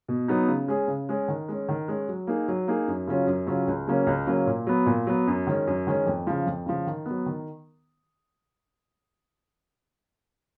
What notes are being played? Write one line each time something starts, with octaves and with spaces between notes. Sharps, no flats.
B2
F#3 B3 D#4
C#3
G#3 C#4 G#4
C#3
G#3 C#4 G#4
D#3
G#3 C#4
D#3
G#3 C#4
F#3
A#3 D#4 G#4
F#3
A#3 D#4 G#4
F#2
C#3 F#3 C#4 F4
F#2
C#3 F#3 C#4 F4
C#2
C#3 F#3 A#3 C#4
C#2
C#3 F#3 A#3 C#4
A#2
F#3 B3
A#2
F#3 B3
F#2
D#3 G#3 C#4
F#2
D#3 G#3 C#4
F2
C#3 F3
F2
C#3 F3
D#3
B3
F#3
D#3